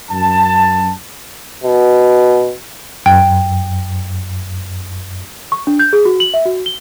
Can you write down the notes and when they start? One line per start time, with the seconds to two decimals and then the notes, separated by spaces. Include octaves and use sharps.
0.11 F#2 A5
1.64 B2
3.06 F#2 G5
5.52 C#6
5.67 D4
5.79 G6
5.93 G#4
6.05 F#4
6.20 F#7
6.34 E5
6.45 F#4
6.66 G7